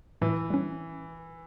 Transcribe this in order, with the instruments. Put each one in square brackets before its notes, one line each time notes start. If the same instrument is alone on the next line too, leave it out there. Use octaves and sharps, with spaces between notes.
[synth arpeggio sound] A2 [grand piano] E3
[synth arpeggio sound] G3 C#4